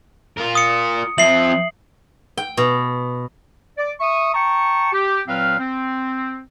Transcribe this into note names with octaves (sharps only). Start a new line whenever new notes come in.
F4 A#4
D#6 C#7
F3 C4 E5 C7 F#7
G5
B2
D5 D6
E5 C#6 D#6
G5 A5 A#5 C#6
G4
A#2 F#3 C4 B4 F5 F6
C4